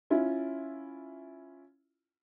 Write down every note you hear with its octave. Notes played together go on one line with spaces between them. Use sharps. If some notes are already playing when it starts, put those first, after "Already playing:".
C#4 E4 F4